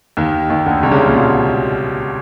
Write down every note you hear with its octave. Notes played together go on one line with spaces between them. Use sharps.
D#2 D#3
D#2 D#3
D2 D3
C2 C3
C#2 C#3
A#2
B2